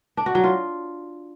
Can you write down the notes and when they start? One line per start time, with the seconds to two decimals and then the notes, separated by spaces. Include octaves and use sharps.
0.17 D4
0.26 F#4
0.35 F#3
0.44 F4